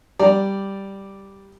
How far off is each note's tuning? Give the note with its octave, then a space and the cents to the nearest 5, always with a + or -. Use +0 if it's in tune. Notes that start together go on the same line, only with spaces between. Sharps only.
G3 +0 D5 +0 A#5 +0